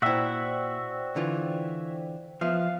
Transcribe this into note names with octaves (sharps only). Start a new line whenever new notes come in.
A#2 E4 F#4 C5 D5 E5 G5
D3 E3 F4
F3 B3 E5 F5